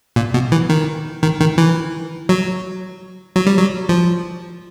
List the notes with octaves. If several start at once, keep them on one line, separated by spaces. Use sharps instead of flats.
A#2
B2
E3
D#3
D#3
D#3
E3
F#3
F#3
G3
F#3
F3